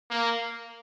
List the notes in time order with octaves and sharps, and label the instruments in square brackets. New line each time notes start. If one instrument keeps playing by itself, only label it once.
[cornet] A#3